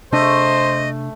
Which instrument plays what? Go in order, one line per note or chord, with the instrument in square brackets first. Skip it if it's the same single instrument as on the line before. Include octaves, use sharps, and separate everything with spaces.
[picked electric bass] C3 D4 [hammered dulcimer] A3 [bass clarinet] C5 [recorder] D#5